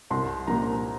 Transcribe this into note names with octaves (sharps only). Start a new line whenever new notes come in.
C2 C6
A#2 F3 A#5